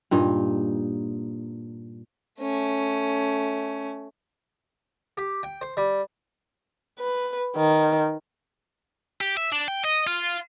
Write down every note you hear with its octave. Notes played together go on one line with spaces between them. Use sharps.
G2 A#2 D#4
A3 C#4
G4
G5
C5
G3
B4
D#3
G4
E5
D4
G5
D#5
F4